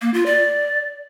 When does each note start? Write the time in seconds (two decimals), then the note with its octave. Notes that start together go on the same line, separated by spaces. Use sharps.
0.02 A#3
0.14 F4
0.26 D5